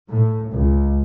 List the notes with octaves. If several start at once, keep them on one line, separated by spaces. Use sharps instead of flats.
A2
C#2